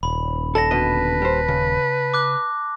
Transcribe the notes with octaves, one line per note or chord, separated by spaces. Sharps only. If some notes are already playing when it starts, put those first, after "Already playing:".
D#1 B5
A4 D5 F#5 A5 A#6
B2 D3 B4 D#5
G3 C5
C#3
D6 F#6